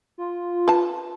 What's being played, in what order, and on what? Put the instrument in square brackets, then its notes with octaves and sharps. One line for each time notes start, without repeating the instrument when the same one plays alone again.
[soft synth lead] F4
[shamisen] B4 A5